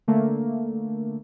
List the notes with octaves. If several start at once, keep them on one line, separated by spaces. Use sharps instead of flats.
D3 A3 A#3